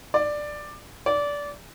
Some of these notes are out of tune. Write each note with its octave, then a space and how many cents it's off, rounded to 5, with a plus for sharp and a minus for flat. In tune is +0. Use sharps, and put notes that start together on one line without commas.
D5 +10
D5 -20